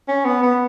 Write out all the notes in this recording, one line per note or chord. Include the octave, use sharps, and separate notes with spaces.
C#4
B3
B3